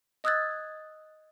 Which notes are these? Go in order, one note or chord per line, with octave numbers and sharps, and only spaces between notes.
D#5 D#6 E6 F#6 G#6 A6